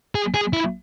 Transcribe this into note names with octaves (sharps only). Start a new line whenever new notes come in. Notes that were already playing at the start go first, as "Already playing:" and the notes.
G#4
G#4
E4